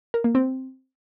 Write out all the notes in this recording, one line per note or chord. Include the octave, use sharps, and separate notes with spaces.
A#4
A#3
C4